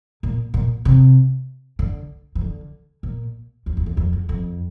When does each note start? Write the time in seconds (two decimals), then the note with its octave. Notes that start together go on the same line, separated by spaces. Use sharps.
0.23 A#2
0.54 A#2
0.85 C3
1.79 D3
2.35 E3
2.41 D3
3.03 A#2
3.66 E2
3.77 E2
3.86 F2
3.97 F2
4.13 E2
4.29 F2